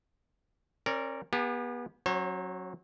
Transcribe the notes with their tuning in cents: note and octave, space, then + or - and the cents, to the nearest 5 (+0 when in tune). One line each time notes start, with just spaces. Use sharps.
C#4 -45 A#4 -10 D5 -15
B3 -30 G4 +40 A5 -10
F#3 +0 C#4 -25 C5 +45